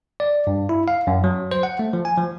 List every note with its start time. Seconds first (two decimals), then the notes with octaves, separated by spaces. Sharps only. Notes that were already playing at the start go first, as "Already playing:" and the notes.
0.20 D5
0.47 G2
0.69 E4
0.88 F5
1.07 F#2
1.24 F#3
1.51 C5
1.63 F#5
1.79 A3
1.93 F3
2.05 G#5
2.18 F3